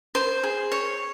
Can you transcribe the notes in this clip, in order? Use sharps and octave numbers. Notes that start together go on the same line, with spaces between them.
C5
G#4
C#5